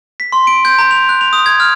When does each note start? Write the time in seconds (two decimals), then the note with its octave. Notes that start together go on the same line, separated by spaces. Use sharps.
0.20 B6
0.32 C6
0.47 D7
0.65 G6
0.78 A#5
0.91 F7
1.09 F#6
1.21 F7
1.33 D#6
1.46 G#6
1.60 F6